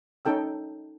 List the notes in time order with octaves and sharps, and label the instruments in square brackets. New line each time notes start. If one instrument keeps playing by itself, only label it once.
[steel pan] C#4 D#4 A4 G5 E6